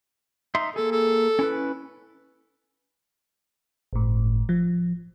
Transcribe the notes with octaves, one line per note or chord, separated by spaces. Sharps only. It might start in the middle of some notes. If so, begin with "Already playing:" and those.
D#4 E5 C6
A#3 G#4 A4
A4
C#4 E4 B4
G1 A2
F3